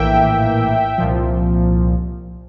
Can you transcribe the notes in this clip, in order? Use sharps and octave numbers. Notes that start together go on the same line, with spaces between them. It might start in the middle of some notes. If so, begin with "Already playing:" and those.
Already playing: A#1 A2 E3 A#3 E5 G5
C2 A#2 F3